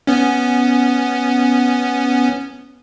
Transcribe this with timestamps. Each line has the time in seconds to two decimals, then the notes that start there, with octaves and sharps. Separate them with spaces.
0.07 B3 C#4